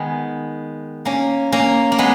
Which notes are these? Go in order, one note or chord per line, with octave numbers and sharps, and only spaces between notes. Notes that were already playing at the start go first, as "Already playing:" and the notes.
Already playing: D#3 G#3 B3
A#3 C#4
A#3 C#4
A#3
G#3 B3